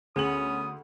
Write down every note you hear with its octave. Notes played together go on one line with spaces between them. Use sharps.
D2 B3 C#4 G#4 D#6 F#7